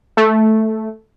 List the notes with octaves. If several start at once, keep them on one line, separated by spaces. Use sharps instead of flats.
A3